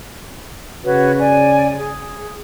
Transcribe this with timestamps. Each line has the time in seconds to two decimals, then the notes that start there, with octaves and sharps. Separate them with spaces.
0.85 C#3 F#4 B4 C#5
1.19 D5 G#5
1.76 G#4